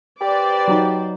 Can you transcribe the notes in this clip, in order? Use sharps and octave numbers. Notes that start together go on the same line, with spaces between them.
G4 B4 C5 D5
F#3 D#4